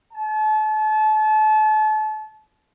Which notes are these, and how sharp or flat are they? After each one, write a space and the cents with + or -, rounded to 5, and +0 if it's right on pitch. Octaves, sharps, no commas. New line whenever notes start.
A5 -35